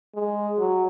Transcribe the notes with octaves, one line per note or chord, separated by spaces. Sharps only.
G#3
F#3